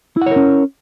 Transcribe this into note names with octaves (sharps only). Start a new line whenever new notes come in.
C#4 E4 A#4 C#5 F#5